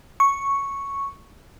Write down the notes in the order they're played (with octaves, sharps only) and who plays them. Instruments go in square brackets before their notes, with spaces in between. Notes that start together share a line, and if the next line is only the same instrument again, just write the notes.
[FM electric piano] C#6